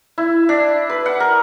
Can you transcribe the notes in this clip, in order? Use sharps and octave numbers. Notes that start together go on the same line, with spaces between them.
E4
D4
B4
F#5
A#4